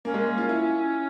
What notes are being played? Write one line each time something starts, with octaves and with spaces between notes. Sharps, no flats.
A#3 C#4
G#3
A#3
F4
E4